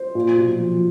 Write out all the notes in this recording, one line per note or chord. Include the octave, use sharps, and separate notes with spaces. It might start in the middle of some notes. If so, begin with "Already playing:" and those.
Already playing: C5
A#2
B1
F3